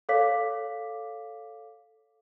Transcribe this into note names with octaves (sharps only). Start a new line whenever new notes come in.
A4 C#5 F5 D6 B6